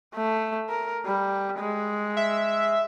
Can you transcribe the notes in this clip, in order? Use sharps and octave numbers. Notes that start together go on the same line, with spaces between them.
A3
A#4
G3
G#3
E5